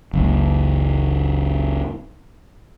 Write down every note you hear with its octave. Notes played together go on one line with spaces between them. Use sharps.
F#1 C#2